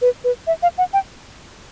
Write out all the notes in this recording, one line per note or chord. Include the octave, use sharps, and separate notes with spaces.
B4
B4
E5
F5
F#5
G5